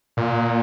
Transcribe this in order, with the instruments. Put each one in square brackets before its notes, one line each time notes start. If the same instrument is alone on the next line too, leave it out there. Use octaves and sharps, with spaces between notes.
[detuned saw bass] A#2